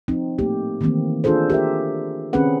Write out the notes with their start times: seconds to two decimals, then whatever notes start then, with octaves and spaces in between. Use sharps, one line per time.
0.08 F3 C4 D#4
0.39 A3 A#3 G4
0.81 D#3 E3 A3 A#3 C4
1.24 D4 F4 G#4 A4 C5
1.50 G4 A#4 E5
2.33 D#3 C4 C#4 G#4 B4 F#5